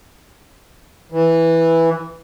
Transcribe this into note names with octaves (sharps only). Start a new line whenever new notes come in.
E3